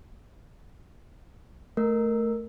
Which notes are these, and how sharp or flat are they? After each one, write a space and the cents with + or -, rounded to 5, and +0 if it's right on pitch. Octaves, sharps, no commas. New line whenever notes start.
A3 +0 A#4 +0